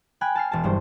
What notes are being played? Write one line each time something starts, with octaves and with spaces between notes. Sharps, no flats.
G5 G#5 B5 F#6
A5 F6 C7
E1 A5
F#1 G2 C5